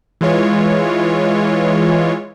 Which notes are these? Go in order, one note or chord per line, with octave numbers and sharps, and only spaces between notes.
E3 G#3 F4 C#5